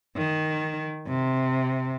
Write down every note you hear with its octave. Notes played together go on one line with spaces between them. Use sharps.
D#3
C3